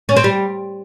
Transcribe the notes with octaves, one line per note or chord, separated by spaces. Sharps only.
C#4
C4
G3